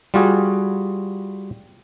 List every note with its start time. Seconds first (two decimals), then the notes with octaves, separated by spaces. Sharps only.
0.14 G3 F4 F#4 G#4